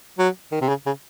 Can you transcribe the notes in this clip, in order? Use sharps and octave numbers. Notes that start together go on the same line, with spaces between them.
F#3
D#3
C3
C#3
C#3